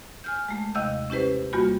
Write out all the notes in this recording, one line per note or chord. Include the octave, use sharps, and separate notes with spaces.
G#5 F6 G6
G#3 A3
D#2 C3 D#5 F5 E6 G6
C#4 E4 G4 B4 C5
E2 G3 A#3 F4 F#4 B5